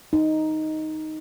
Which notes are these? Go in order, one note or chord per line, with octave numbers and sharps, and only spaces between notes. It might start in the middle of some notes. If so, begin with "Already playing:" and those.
D#4